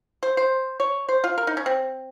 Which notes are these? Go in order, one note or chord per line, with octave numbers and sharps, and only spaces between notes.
C5
C5
C#5
C5
F4
A#4
D#4
C#4
C4